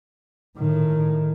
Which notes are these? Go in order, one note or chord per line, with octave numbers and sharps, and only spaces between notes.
A2 D#3